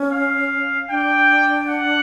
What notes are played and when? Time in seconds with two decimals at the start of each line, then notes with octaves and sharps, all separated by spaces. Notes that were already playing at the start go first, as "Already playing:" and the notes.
Already playing: C#4
0.12 F5
0.89 D4 G5
1.68 F#5